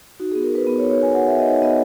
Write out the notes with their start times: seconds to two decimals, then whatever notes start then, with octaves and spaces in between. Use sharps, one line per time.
0.20 D#4 F#4
0.32 G#4
0.35 B3
0.43 A#4
0.51 F#4 B4
0.67 B3
0.78 C#5
0.83 D#4
0.90 C#5
0.99 B3 G#5
1.14 F#4 F#5
1.26 E5
1.31 B3
1.39 D#5
1.46 D#4 C#5
1.62 B3 D#5